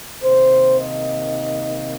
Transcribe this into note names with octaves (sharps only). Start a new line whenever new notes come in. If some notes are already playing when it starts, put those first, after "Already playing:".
C3 D#3 A#3 D#4 C5
D#5